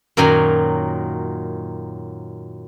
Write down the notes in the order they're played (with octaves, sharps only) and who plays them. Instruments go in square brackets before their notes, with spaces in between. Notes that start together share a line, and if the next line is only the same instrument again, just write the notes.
[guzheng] F#2 A#2 D#3 F#3 G#5 A#5